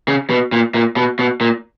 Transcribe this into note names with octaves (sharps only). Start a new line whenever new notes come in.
C#3
B2
A#2
A#2
B2
B2
A#2